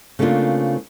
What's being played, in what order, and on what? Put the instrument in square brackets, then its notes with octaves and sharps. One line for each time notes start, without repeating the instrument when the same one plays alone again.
[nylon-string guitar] C#3 A3 A#3 C4 D4 F4